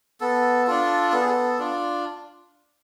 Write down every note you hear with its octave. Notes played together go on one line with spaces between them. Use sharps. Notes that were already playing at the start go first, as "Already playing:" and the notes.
B3 A4
D4 F4 A4
B3 A4
G#4
A4
D4 F4